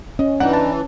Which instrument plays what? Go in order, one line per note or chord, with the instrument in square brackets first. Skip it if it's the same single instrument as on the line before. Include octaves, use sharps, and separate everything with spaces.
[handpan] C#4 [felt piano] D#5
[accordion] E3 [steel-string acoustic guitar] D4 D#4 [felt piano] F#5
[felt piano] A5